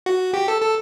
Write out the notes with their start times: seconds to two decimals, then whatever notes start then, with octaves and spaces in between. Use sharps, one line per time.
0.06 F#4
0.34 G4
0.48 A4
0.62 A4